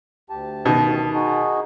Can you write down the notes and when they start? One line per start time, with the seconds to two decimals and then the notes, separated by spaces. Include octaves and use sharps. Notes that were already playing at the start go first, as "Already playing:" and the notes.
0.30 D2 G4 A5
0.65 B2 D#3
1.13 D#4 F#4 G#4